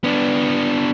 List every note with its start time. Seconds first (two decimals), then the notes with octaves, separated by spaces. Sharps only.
0.04 B3 D4